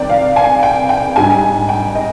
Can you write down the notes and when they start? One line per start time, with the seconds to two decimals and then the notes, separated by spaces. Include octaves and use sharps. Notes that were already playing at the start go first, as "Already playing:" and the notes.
Already playing: C2 C3 D#3 D5 G5
0.10 F5
0.36 G#5
0.63 G5
0.89 G5
1.16 G#2 G3 D4 G#5
1.69 G5
1.95 D#5